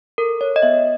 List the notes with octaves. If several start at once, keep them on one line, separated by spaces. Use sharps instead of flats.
A4 A#4
C#5
D#5
B3 E5